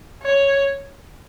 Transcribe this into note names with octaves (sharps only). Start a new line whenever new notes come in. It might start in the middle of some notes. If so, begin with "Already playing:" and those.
C#5